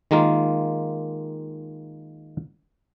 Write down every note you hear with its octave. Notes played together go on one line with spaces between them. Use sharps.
D#3 G#3 A#3 F4